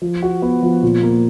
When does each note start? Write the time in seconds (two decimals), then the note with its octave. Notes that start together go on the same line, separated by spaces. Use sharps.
0.02 F3
0.22 F#4
0.42 B3
0.63 F3
0.83 A#2
1.03 A#3